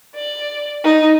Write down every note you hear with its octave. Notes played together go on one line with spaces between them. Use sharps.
D5
D#4